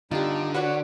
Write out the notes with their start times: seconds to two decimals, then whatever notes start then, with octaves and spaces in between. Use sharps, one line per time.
0.11 G2 D3 B3 D#4 F4 G4
0.54 F#4 B4 C#5 D5 F#5